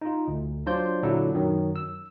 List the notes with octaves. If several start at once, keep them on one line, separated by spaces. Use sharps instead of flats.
D#4 F4
D2
F#3 D4 F4 C5 D5 G6
A#2 D3 F#3 D4 E4 A4
F#2 D#3 F#3
E6